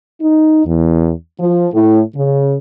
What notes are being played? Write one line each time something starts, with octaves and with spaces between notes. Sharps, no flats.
D#4
E2
F3
A2
C#3